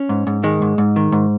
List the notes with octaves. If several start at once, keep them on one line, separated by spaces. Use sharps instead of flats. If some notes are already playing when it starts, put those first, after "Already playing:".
Already playing: C#4
G#2
G#2
D#3 G#3
G#2
G#2
D#3
G#2